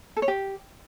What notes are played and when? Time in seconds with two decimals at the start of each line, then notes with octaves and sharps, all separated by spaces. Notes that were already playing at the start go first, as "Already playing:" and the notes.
0.17 A4
0.22 C#5
0.28 G4